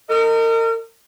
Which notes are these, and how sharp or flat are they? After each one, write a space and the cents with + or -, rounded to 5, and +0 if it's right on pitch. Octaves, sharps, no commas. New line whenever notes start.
A#4 -35 D#5 +0